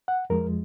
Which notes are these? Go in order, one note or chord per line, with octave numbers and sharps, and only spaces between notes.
F#5
F2 F3 G#3 A#4